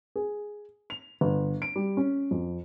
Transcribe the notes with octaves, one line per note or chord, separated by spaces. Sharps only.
G#4
F7
G1
D7
G3
C#4
F2